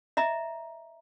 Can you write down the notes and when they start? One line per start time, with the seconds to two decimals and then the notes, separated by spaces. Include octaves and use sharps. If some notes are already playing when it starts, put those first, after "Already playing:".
0.17 D#5 E5 A#5